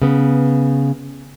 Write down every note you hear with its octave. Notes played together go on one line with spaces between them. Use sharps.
C#3 B3